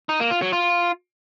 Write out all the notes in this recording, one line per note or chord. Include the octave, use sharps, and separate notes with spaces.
D#4
A#3
F4
F#3
F4